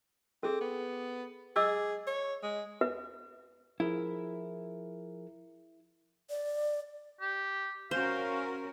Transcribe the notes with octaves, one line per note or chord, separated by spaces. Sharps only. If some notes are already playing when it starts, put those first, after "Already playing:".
C4 G#4 A4
B3
G#4 D#5 D6 E6
C#5
G#3
B4
F3 E4 G#4 A#4
D5
G4
C#4 F#4 A#4 C5 F5